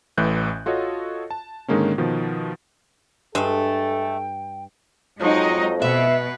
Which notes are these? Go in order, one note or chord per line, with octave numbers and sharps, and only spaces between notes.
A1 A2 E3 F#6 G6
F4 F#4 A4 C#5 D#5
A5
G#2 D3 D#3 G#3 A#3 C#4
B2 D#3 F3
G2 G#3 A3 A4 E5 G5
F2 F#3 G#3 D#4 D#5
B2 B4 E5